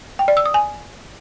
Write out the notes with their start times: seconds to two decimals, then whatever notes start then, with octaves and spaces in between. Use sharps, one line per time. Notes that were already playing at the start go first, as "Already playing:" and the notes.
0.19 G5
0.28 D5
0.37 E6
0.46 D#6
0.54 G#5